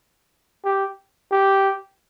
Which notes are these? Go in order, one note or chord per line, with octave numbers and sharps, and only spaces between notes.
G4
G4